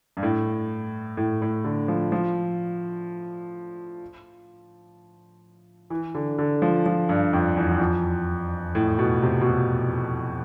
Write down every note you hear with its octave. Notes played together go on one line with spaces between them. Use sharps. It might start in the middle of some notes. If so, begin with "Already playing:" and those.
G2
A2
A2
A2
D3
F3
F3
E3
D3
D3
F3
F3
G2
F2
E2
E2
F2
A2
B2
C3
B2
C3